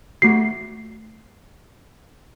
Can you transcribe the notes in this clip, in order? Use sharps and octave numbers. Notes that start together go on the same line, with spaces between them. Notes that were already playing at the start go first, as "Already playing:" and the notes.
A3 F#4 C7